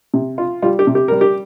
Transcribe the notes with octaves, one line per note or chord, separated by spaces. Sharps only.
C3
F4
G3 F4
G4
C3
G4
G3 A#4
G4